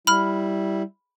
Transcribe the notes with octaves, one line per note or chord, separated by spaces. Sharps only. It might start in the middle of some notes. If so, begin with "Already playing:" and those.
G3 E4 B5 F6